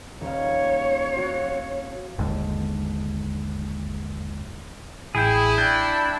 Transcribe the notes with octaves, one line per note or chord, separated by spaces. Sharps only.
D#1 C#5 F5
C4 F4 F#4
G1 D#2 G#2 D3
A1 E4 G#4 G5
D4 G5 G6